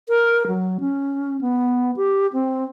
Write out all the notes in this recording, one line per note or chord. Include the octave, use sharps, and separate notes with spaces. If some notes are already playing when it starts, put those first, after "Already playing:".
A#4
F#3
C#4
B3
G4
C4